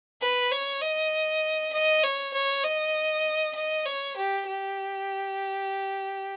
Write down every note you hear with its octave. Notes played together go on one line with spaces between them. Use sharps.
B4
C#5
D#5
D#5
C#5
C#5
D#5
D#5
C#5
G4
G4